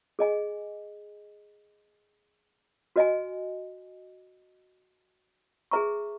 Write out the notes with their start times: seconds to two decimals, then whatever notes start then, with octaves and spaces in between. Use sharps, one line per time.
0.19 G#4 D#5 G#5
2.96 F#4 B4 D#5 G#5
5.71 G#4 B4 E5 A#5 C#6